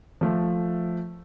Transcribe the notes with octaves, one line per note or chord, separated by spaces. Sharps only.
F3 A3